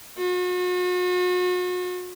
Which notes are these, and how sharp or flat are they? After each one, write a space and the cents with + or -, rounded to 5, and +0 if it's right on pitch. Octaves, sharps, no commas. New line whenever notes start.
F#4 -40